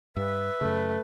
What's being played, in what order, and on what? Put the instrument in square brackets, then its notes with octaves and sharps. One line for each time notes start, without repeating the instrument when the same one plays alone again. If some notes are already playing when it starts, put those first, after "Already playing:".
[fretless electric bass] G2 [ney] B4 [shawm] E5
[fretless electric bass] F#2 C#3 [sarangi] A3